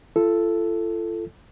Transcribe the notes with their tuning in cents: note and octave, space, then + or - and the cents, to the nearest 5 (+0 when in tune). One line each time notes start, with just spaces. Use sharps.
F4 -40 A4 +0